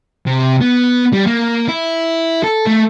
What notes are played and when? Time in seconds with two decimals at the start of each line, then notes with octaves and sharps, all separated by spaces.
0.27 C3
0.61 B3
1.13 G3
1.26 A#3
1.68 E4
2.44 A4
2.67 A3